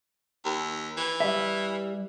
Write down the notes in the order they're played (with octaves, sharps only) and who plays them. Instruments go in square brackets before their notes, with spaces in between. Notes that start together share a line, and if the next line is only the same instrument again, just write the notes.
[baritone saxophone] D#2
E3
[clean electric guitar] G3 E5